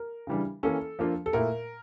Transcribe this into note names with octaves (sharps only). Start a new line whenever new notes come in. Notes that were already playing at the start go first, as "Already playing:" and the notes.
Already playing: A#4
C#3 E3 G3 D4
E3 A#3 C#4 A4
F3 A#3 D4 F4
A4
A#2 A3 E4 A#4